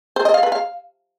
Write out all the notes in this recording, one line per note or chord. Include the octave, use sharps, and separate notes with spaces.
C5
D#5
F5
B4
F5